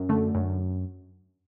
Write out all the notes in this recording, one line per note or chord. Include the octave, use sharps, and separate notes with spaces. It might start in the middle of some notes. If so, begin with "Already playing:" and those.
Already playing: F#2
D3 A3
F#2